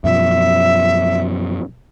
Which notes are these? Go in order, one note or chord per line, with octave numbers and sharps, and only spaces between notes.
F#2 B2 F3 E5